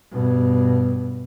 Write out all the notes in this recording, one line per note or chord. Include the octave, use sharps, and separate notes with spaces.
G2 B2